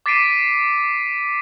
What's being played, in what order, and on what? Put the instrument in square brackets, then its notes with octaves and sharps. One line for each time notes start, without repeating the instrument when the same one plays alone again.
[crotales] D6 A6 B6 C7 D7 D#7